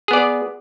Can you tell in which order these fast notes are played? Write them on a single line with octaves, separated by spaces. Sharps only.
G#4 B3 D5